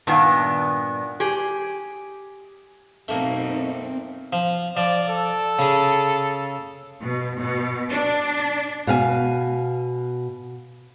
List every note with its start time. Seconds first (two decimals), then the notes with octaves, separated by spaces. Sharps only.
0.07 G2 A#2 D#3 B3 D4
1.20 G4 G#4
3.08 F#2 B2 A3 A#3 C4 D#4
4.33 F3
4.77 F3 D5
5.09 A4
5.59 C#3 G#4
7.01 B2
7.41 B2
7.90 D4
8.87 B2 F5 G#5